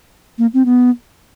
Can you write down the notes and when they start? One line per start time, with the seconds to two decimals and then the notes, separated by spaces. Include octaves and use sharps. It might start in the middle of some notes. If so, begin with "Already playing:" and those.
0.38 A#3
0.54 C4
0.65 B3